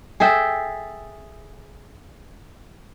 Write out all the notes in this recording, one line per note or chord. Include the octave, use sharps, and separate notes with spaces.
G#4 A4 E5 G5